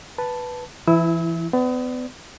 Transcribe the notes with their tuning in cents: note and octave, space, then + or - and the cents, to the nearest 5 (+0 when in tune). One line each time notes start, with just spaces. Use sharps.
B4 +0 A5 +0
E3 +30 E4 +0 E6 -35
B3 +35 D5 +0